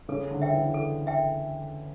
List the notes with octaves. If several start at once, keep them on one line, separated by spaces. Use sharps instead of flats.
C#3 A4
D3
E5 G5
E3
A4
E5 G5